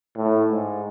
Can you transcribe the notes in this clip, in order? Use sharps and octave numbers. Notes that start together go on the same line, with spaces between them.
A2
G#2